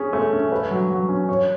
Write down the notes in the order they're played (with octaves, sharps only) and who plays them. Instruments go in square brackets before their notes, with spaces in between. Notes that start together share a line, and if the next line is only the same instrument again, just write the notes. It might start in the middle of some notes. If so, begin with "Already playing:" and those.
Already playing: [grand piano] C#4 G#4
A3
C#4
B4
F#3
F#3
C#4
C#5